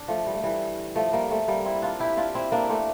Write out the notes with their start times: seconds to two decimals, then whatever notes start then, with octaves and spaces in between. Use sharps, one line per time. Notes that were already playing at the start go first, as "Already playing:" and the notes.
Already playing: D4
0.08 F3 A3
0.26 G3
0.35 A3
0.44 E3 G3
0.95 F3 A3
1.13 G3 A#3
1.31 A3 C4
1.48 G3 A#3
1.65 C4 E4
1.82 D4 F4
2.00 E4 G4
2.17 D4 F4
2.35 C4 E4
2.52 A#3 D4
2.70 A3 C4